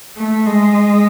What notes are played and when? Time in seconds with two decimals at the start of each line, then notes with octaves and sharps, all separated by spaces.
0.17 A3
0.46 G#3